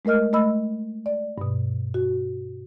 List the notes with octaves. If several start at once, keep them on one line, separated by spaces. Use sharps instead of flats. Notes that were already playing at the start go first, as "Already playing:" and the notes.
G#3 A3 A#4 D#5 F6
G#3 A3 D#5 B5 E6
D5
G2 B2
F#4